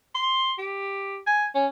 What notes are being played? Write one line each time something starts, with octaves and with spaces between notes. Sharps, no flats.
C6
G4
G#5
C#4